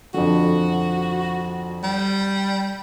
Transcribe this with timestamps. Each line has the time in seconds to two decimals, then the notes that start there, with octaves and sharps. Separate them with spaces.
0.14 F2 D3 F#4
1.83 G3